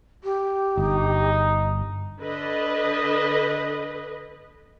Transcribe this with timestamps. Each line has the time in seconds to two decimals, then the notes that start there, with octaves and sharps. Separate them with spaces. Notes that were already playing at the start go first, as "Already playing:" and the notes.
0.24 G4
0.78 G1 D#4
2.20 D3 B4 D#5